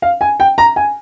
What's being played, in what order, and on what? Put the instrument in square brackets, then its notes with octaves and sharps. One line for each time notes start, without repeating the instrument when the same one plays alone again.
[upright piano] F5
G#5
G5
A#5
G#5